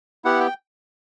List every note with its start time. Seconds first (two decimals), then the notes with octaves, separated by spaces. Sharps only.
0.25 B3 E4 G4 F#5
0.40 G5